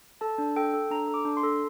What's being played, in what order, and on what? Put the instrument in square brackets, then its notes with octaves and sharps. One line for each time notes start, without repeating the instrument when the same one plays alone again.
[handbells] A4 A5
D4
A4 G5
A4
D4 A#5
A4
D6
D4
C6
A4